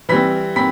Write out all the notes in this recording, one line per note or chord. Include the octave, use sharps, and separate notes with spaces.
E3 G3 C4 B5 B6
C4 B5 B6